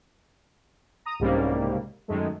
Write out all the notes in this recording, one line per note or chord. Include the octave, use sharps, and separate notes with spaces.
A#5 D#6
C2 G#2 C#3 G3 A#3
F#2 D#3 G#3 A3